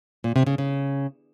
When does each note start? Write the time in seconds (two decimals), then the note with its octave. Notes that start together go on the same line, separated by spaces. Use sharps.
0.24 A#2
0.36 C3
0.46 C#3
0.58 C#3